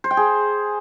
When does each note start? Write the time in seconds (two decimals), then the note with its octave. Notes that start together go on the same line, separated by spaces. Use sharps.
0.04 C5
0.11 G5
0.17 G#4